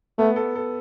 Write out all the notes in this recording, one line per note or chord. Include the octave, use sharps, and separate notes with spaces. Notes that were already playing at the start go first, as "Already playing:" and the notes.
A3 B3
A4
A4